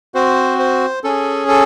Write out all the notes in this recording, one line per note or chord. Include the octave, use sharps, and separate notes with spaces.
C4 F#4 C5
C5
C#4 G#4 A4
A4